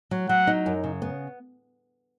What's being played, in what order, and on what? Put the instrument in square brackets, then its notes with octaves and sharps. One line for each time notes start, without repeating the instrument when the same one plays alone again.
[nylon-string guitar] F#3
[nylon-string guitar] F#3 [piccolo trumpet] F#5
[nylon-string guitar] D#4
F#2
C#3
B3